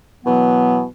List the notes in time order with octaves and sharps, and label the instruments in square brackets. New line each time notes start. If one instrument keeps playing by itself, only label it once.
[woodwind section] B2 E3 F#3 B3